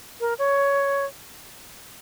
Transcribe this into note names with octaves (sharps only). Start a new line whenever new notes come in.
A#4
C#5